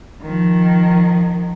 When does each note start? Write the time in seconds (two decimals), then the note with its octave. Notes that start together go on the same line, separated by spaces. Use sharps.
0.22 D#3 F3